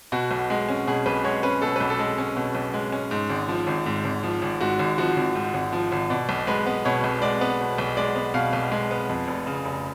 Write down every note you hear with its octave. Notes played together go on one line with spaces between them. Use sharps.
B2 F#4
B1
G#3
C#4
B2 G#4
B1 B4
G#3 C#5
C#4 B4
B2 A4
B1 B4
A4
G#3
C#4
B2
B1
G#3
C#4
G#2
G#1
F3
G#1
G#2
G#1
F3
G#1
G#2 F#4
G#1
F3 F#4
G#1
G#2
G#1
F3
G#1
B2 D5
B1
G#3 B4
B3
B2 C#5
B1
G#3 D5
B3
B2
B1
G#3 D5
B3
B2 F5
B1
G#3
B3
F2
F1
C#3
F1